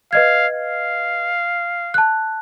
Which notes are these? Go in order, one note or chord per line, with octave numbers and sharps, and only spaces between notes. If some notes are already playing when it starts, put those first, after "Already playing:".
B4 D#5 F5 G#6
F5
A5 F#6